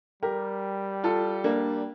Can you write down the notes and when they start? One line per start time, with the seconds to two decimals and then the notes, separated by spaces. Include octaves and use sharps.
0.22 G3 G4 A#4
1.04 F4 A4
1.44 A#3 D4